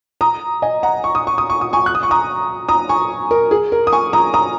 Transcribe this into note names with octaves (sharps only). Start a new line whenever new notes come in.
A#5 D#6
D#5 G#5
F#5 A#5
C#6
D#6
C#6
D#6
C#6
D#6
G#5 C#6
F#6
D#6
C#6
A#5 D#6
A#5 D#6
G#5 C#6
A#4
G#4
A#4
D#6
G#5 C#6
A#5 D#6
A#5 D#6